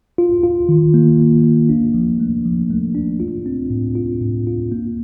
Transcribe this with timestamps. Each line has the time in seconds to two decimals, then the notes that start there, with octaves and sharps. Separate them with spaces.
0.18 F4
0.43 F4
0.69 D#3
0.94 A#3
1.20 A#3
1.44 A#3
1.69 D4
1.94 F3
2.20 A3
2.45 F3
2.70 A3
2.95 D4
3.20 F4
3.46 C4
3.70 A2
3.95 F4
4.21 A2
4.47 F4
4.72 A#3